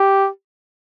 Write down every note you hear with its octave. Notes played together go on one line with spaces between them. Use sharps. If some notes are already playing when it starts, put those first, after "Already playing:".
Already playing: G4